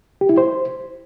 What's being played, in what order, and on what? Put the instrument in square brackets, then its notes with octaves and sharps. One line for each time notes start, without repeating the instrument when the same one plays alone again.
[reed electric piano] G4
E4
C5